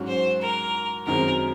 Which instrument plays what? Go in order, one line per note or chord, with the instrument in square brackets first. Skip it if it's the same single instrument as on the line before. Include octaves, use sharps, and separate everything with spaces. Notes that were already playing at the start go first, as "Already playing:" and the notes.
Already playing: [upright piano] G#2 F#3 C#4 F#4
[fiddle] C5
A#4
[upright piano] F#2 D#3 G#3 C4 [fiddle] A#4